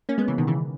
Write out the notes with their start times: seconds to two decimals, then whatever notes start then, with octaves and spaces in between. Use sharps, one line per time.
0.09 A#3 C#4
0.18 G#3 B3
0.28 C#3 E3
0.38 B2 D#3
0.47 C#3 E3